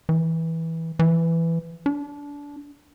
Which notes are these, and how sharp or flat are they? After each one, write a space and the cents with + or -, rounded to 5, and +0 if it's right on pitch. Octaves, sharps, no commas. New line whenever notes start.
E3 -15
E3 +10
D4 -25